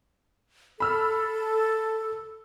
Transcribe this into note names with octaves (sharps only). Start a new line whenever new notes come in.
A4 B5 E6 F6